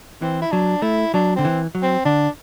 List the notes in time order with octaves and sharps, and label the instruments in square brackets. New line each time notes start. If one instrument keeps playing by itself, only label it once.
[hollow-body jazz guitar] E3 [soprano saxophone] C4
[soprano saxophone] E4
[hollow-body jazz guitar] F#3 [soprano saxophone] D4
[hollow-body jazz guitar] A3 [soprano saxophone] E4
[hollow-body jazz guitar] F#3 [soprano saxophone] D4
[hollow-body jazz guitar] D3 [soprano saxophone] C4
[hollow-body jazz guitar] E3
F#3
[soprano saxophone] C4
[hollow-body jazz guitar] D3 [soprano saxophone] D4